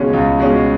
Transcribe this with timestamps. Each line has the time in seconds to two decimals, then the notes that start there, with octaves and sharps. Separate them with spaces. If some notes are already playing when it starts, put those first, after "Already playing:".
Already playing: C#2 B2 G#3 C#4
0.13 C#2
0.38 B2 G#3 C#4